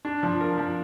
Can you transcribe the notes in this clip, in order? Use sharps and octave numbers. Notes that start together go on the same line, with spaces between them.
D4
F3
A#4
F3